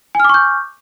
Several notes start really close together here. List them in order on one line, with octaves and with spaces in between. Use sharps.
G#5 F6 D6 C#6 G6